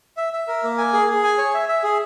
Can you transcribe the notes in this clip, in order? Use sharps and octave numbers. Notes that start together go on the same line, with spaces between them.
E5
E5
A#4
A#3
G#5
G#4
G#4
G#5
C#5
E5
E5
G#4